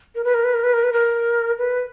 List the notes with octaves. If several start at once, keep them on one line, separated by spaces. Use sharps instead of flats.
A#4
B4
A#4
B4
A#4
B4
A#4
B4
A#4
B4